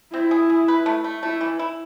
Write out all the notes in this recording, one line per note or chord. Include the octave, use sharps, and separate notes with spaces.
C4 E4
G#4
G#4
B4
A3
A3
A3 E4
E3
E4